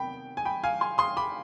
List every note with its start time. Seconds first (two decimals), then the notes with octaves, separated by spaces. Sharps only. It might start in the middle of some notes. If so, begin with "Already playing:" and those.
Already playing: C3 D#3 B3 G5 B5
0.37 G#5
0.45 G5 B5
0.64 F5 G#5
0.81 G#5 C6
0.98 C6 D#6
1.17 B5 D6